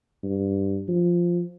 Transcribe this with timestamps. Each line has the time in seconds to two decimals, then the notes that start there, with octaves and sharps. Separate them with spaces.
0.23 G2
0.88 F3